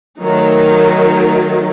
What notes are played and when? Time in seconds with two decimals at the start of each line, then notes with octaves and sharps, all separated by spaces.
0.19 D#3 F#3 A3 D#4